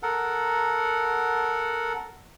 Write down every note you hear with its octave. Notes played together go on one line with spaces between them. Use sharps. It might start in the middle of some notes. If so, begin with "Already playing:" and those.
A4 A#4 F#5